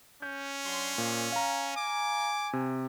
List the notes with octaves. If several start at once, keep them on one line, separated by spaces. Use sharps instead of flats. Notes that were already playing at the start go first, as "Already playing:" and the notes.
C#4 G6
F#3 D4 C6
A#2 A#3 C5
F5 G#5 A#5
D6
C3